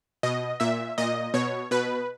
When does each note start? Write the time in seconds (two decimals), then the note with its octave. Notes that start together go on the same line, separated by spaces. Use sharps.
0.23 B2 D#5
0.60 A#2 E5
0.98 A#2 D#5
1.34 B2 C#5
1.71 B2 B4